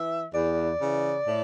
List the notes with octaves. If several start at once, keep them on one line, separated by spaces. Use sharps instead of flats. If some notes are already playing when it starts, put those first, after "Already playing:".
Already playing: E3 E5
E2 D5
C#3 E3
A2